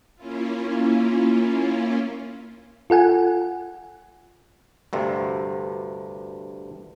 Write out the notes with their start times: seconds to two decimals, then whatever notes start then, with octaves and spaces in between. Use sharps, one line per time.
0.15 A#3 C#4 E4 F4
2.90 F4 A4 F#5 G#5
4.93 D2 G2 C3